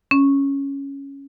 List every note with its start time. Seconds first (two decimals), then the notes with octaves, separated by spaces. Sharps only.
0.11 C#4